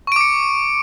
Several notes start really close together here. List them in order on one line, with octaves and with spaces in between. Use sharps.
C#6 D7 D6 C#7